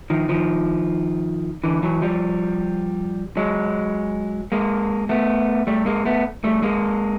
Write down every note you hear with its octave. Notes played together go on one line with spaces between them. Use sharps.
D#3 F3
D#3 F3
D3 E3
E3 F#3
F3 G3
F#3 G#3
G#3 A#3
A3 B3
G3 A3
G#3 A#3
A3 B3
G3 A3
G#3 A#3